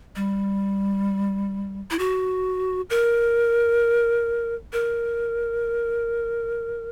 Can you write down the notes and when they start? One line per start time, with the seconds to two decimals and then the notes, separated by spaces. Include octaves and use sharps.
0.16 G3
1.91 E4
1.99 F#4
2.90 A#4
4.73 A#4